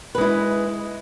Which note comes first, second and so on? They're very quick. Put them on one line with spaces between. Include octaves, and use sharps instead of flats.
B4 G#3 E4